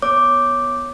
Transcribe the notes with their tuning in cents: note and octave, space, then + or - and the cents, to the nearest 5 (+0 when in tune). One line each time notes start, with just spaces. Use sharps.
B3 +0 C#5 +0 D6 +0